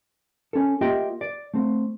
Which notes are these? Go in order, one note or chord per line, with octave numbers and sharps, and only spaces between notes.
C#4 A4
A#3 F4 G4 D#5 E5 G5
D5
A3 C4